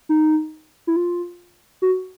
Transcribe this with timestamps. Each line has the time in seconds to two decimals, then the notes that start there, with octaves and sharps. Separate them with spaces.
0.09 D#4
0.87 E4
0.96 F4
1.82 F#4